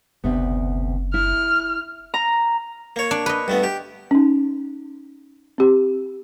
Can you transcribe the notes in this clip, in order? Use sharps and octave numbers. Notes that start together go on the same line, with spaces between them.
F#1 D2 C3 B3
E4 F6
A#5
A#3 C#5
D4
B4 D#5
G2 A3 B3
G4
C#4 D#4
C4 G4